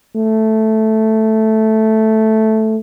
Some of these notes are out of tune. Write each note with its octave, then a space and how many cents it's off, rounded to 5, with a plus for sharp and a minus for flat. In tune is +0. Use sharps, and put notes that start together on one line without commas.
A3 -5